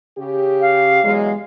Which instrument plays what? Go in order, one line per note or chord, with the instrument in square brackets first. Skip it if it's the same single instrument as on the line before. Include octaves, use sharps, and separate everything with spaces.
[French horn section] C#3 G4
[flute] F5
[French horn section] E2 F#3 G#3